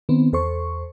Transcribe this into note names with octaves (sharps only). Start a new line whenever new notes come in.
D#3 B3 C4
E2 A4 C5 C#6